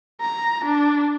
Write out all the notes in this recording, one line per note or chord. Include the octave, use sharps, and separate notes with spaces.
A#5
D4